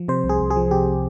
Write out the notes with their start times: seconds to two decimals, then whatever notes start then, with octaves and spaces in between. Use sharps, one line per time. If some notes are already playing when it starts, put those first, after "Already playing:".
Already playing: F3
0.08 C3 C5
0.24 C2
0.29 G#4
0.40 C2
0.50 G#4
0.56 F3
0.71 C3 G4